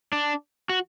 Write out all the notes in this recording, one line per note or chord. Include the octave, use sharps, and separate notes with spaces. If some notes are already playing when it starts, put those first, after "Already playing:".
D4
F#4